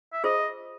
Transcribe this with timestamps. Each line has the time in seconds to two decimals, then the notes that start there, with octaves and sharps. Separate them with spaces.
0.13 E5
0.24 F4 G#4 C5 D#5